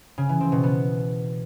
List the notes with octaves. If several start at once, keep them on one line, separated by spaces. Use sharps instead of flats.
C#3
E3
C4
B2
B3